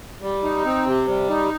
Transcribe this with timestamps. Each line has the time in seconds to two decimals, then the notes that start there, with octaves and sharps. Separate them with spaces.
0.22 G3
0.43 D#4
0.65 C4
0.86 C3
1.08 G3
1.29 D#4